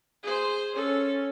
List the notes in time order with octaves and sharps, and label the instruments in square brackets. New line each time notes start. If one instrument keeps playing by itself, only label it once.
[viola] G#4 C5
[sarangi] C#4 [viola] A4